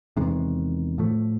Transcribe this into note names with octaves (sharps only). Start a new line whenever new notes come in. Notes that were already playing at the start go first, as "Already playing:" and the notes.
E2 C3 D#3 G#3
A2 F3 A3